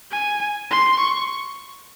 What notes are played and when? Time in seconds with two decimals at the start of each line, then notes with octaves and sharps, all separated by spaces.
0.11 G#5
0.71 C6
1.00 C#6